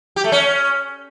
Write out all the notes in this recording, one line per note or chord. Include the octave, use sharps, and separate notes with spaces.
G4
A3
C#4